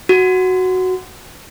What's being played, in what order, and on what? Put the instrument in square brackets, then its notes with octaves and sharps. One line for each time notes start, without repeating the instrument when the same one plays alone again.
[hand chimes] F#4